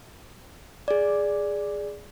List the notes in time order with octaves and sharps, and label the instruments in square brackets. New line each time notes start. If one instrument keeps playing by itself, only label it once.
[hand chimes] G#4 D5